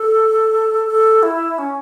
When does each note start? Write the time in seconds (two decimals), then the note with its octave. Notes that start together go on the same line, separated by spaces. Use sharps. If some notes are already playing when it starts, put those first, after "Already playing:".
Already playing: A4
0.87 A4
1.23 E4
1.58 C#4